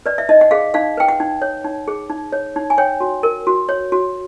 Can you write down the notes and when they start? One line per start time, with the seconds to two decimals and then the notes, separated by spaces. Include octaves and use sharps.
0.06 B4 D5
0.18 E5
0.29 D#4 D#5
0.41 F#5
0.51 G#4 F5
0.74 D#4 F5
0.97 B4 G5
1.08 F#5
1.20 D#4
1.42 C#5
1.64 D#4
1.88 G#4
2.10 D#4
2.32 C#5
2.56 D#4
2.70 G#5
2.78 C#5 G5
3.00 F#4
3.23 A#4
3.47 F#4
3.69 C#5
3.92 F#4